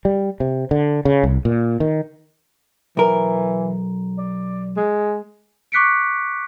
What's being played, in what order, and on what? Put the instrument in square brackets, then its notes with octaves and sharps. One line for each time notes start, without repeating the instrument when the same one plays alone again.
[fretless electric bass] G3
C3
D3
C#3
C2
A#2
D#3
[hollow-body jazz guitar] B1 A#4 [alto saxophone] E3
[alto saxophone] D5
G#3
[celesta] C#6 D6 F#6 B6 C#7 D7